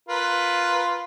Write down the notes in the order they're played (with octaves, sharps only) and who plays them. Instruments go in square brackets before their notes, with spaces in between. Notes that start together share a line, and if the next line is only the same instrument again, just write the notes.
[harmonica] F4 A#4 B4